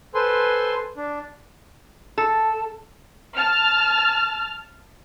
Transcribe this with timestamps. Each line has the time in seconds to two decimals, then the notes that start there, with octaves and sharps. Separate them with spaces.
0.15 A4 B4 C5 G#5 C6
0.97 D4
2.18 A4
3.36 A5 F6